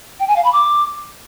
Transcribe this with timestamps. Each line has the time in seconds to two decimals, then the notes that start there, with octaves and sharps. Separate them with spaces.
0.20 G5
0.28 G#5
0.36 F5
0.44 B5
0.53 D6